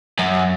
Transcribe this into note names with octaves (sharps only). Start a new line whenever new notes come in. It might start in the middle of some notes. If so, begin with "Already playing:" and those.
F#2